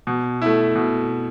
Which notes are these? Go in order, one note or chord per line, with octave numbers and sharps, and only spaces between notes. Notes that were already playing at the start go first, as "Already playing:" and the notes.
B2
A3 E4
B2